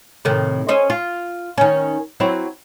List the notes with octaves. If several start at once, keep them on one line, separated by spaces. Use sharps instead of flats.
A2 C3 D#3
C#4 C5 D#5
F4
D#3 C#4
F#3 C4 E4